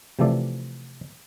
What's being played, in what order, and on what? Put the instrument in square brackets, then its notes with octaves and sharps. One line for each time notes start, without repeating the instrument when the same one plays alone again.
[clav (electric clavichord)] C3 E3 F3 A3 A4 D5